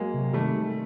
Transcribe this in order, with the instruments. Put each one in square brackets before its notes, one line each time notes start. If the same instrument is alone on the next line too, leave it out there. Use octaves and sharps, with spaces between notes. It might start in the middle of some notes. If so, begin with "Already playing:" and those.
Already playing: [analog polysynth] F#3 [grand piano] G#3 A#3
[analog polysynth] C3
[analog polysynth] D#3 [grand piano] G3 A3